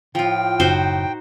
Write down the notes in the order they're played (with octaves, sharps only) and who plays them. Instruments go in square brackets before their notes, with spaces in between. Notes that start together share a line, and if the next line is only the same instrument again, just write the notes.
[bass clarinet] A2 [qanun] F3 F4 [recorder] G5
[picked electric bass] F#1 [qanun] D#4 F#4 C5